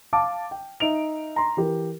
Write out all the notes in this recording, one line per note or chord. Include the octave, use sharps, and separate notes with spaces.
F5 A5 D6
G5
D#4 E5 D7 F7
A#5 C6
E3 G4 A#4